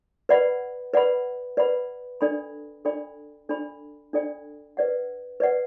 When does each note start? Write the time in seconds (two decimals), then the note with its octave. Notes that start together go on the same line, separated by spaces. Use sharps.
0.29 B4 D5 F#5 B5
0.94 B4 D5 F#5 B5
1.57 B4 D5 F#5 B5
2.21 D4 A4 D5 G5 B5
2.85 D4 A4 D5 G5 B5
3.49 D4 A4 D5 G5 B5
4.13 D4 A4 D5 G5 B5
4.77 B4 D5 F#5
5.40 B4 D5 F#5